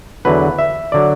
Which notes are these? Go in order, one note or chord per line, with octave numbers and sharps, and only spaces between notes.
E2 D3 F#3 B4
E5
D3 F#3 D5